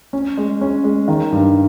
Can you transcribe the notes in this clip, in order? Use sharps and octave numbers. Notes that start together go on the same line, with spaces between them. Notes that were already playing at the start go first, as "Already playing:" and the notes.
C#4
G#3
C#4
G#3
D#3
G2